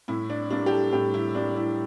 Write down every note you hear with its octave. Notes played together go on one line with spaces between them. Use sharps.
A2 E4
D4
G3 A#3 D4
G4
A4
A2 G4
E4
G3 A#3 D4
E4